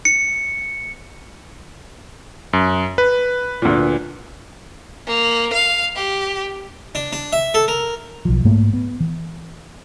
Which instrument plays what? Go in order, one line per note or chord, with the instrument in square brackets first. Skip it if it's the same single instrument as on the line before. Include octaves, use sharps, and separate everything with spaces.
[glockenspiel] C#7
[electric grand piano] F#2
B4
[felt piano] D2 A#2
[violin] A#3
F5
G4
[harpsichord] D4
D4
E5
A4
A#4
[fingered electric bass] B1 F3
G#2 A3 A#3
B3
E3